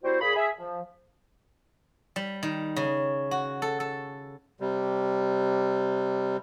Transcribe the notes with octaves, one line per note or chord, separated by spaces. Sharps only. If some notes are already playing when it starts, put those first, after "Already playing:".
G3 C4 E4 F#4 C5
A#2 G#4 B5
G#4 E5
F3
G3
D#3
C#3
F#4
A4
A4
C3 G3